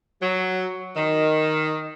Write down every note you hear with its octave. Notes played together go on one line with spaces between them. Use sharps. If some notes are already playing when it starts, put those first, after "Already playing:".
F#3
D#3